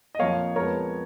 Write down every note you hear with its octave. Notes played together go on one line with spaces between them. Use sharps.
D#5
F2 F3 A#3 C#5 F5
F2 F3 G#3 B3 A#4 C#5